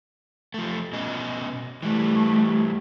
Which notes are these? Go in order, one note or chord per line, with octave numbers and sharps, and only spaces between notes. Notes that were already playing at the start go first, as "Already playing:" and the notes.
F3 A3
B2 C#4 D#5
E3 G3 A3